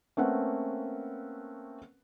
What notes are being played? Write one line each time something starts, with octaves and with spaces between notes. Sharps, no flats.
A3 A#3 C4 C#4 B4 F#5